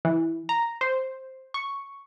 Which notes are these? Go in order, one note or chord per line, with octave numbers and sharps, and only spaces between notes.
E3
A#5
C5
C#6